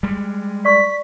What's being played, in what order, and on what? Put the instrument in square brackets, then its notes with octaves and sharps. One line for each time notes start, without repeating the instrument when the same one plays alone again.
[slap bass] G3 G#3
[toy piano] D5 C#6 [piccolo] B6